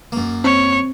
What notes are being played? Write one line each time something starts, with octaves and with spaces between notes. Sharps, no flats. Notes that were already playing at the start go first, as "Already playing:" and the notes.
F#2 A#3
C4 C#5